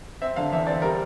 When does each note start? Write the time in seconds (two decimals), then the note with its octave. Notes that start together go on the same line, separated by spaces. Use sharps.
0.22 C4 E5
0.36 D3 F5
0.52 E2 E5
0.67 C4 D5
0.82 G3 A#4